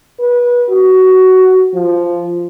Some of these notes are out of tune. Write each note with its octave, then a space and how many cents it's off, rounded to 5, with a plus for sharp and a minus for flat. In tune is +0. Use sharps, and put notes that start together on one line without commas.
B4 -25
F#4 +15
F3 -10